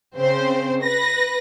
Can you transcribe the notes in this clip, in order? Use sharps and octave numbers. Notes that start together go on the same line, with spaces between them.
C#3 C4 C5
B4 A#6